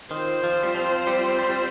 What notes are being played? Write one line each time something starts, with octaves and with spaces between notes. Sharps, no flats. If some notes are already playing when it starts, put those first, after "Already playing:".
D#3 C4 F4 C5
F3
G3
F3
G3
G3
G3